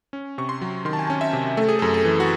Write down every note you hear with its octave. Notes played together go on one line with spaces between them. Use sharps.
C#4
C3 C#6
C6
F#3
D#3 C6
A5
G#5
C#4 A5
E5
C3
A3 A4
G#4
F#2 A4
A4
E3
F#4